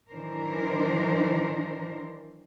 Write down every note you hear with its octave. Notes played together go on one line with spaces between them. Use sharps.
D#3 E3 F#3 D4 A#4 C5